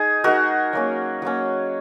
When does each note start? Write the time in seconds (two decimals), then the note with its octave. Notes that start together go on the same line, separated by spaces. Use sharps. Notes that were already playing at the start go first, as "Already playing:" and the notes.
Already playing: D#4 G#4
0.24 G#3 D#4 F#4 A#4
0.73 F#3 A#3 C#4
1.22 F#3 A#3 C#4